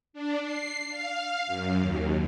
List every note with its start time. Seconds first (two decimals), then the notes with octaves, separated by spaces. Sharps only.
0.13 D4
0.43 C7
0.90 F5
1.47 F#2
1.80 D#2